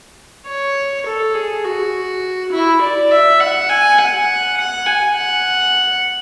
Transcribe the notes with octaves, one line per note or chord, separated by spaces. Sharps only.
C#5
A4
G#4
F#4
E4
D5
E5
F#5
G#5
F#5
F#5
G#5
F#5